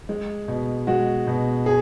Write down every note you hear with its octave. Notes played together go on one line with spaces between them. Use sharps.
G#3
B2
G#3 F#4
B2
G#4